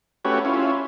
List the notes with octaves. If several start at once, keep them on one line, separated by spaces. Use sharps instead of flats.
A3 C#4 F#4 G4 B4 C#5
C#4 E4 F4